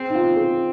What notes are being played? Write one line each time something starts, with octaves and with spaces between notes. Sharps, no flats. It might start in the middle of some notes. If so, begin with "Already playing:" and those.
Already playing: C4 G#4
D#4
F4
G#4